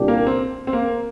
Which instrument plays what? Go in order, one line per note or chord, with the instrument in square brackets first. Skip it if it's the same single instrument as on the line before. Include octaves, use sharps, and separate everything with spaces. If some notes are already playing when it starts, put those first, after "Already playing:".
Already playing: [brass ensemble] C2 A#2 G3 D4 G4
[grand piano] A#3
C4
C4
A#3